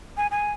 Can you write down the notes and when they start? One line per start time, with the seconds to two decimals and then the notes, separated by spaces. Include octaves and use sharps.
0.17 G#5
0.31 G#5